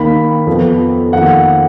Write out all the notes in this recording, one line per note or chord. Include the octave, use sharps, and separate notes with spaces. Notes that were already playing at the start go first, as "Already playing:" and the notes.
Already playing: D#2 D#3 A#3 B5
F2 F3 B3
F2 D#3 A#3 F#5